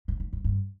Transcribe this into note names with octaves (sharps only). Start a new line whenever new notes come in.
G#2
G#2
G2
G2